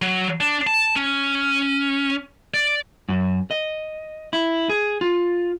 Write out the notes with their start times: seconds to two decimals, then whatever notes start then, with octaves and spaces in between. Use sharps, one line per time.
0.02 F#3
0.40 D4
0.67 A5
0.96 C#4
2.54 D5
3.09 F#2
3.51 D#5
4.33 E4
4.69 G#4
5.01 F4